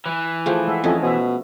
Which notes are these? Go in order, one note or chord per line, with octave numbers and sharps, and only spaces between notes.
E3
F3 A3 G#4 G5
G#3 E5 F#5
F2 C#4 A4 D#5 G#5
B2 C5 E5